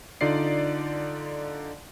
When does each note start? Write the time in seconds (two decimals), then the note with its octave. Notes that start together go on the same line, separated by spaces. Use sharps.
0.21 D3 D#4 F4 D5 C7